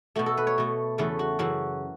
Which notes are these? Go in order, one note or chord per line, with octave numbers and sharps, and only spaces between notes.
B2 A3 F#4
A4
B4
C#5
B2 A3
E2 C#3 A3 B4
F#4
F#2 C#3 E3 F#4